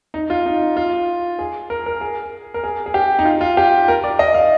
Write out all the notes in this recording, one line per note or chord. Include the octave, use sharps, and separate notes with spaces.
D#4
F4
D#4
F4
G#4
A#4
A#4
G#4
A#4
G#4
G#4
G4
D#4
F4
F4
G4
A#4
D5
D#5
F5